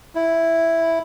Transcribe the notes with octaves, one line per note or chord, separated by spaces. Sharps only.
E4